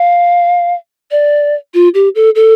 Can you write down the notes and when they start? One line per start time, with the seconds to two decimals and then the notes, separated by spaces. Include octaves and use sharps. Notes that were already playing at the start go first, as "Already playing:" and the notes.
Already playing: F5
1.11 D5
1.74 F4
1.94 G4
2.15 A4
2.35 A4